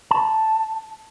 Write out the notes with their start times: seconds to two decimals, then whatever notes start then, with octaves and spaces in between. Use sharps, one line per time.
0.11 A5